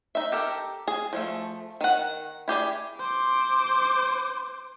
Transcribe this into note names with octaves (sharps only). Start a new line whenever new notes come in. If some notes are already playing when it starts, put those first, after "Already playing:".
D#4 E5
G4 A4 A#4
G#4
F3 G#3 A3
D#3 F#5
E4 G4 G#4 D5
C5 D6